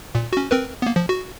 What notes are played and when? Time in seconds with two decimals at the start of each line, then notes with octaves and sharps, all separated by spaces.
0.15 A#2
0.33 C#4 F#4
0.51 C4 A#4 B4
0.82 A#3 B3
0.96 F3
1.09 F#4